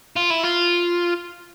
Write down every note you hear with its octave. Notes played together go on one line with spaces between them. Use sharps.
F4
E4
F4